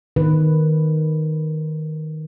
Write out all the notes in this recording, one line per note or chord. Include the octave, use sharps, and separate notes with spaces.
D#3 B4